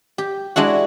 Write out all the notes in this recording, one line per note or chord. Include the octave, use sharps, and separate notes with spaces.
G4
G#3 D4 E4 F#4